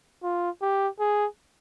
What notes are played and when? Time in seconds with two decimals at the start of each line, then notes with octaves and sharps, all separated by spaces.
0.23 F4
0.62 G4
1.00 G#4